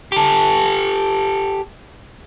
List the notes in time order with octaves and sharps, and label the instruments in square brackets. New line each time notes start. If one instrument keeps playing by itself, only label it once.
[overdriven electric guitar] G4 A4